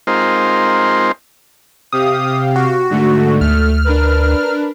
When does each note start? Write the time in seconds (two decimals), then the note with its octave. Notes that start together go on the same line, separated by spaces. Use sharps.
0.07 G#3 C4 D#4 F4 A#4 C5
1.92 C3 G4 F5 D#6
2.56 F#4
2.90 G#2 D3 A3
3.41 D2 A3 F6
3.85 D4 A#4 B4